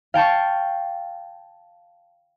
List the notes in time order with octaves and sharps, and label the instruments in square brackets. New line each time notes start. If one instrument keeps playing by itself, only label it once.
[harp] F5 G5 A5 C#6